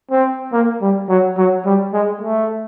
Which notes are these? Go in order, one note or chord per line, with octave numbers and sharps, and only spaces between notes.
C4
A#3
G3
F#3
F#3
G3
G#3
A3